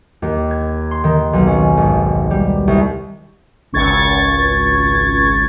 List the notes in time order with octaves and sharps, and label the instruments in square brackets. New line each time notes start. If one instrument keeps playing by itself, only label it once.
[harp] D#2
G#6
C6
D#3
B1
C#4
G#1
G3
C2
[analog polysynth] G#1 C#2 C#6 G#6 A6